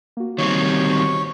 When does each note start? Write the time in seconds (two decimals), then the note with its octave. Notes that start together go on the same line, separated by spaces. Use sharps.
0.17 A#3 F#4
0.38 D#3 G3 C4 C#5